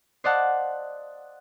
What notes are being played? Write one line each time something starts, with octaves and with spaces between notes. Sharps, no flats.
C5 D5 D#5 F5 F#5 A5